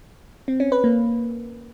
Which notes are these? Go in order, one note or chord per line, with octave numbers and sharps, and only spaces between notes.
C4
C#4
B4
A#3